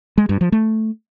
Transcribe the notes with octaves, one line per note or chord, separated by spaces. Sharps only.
G#3
G2
F3
A3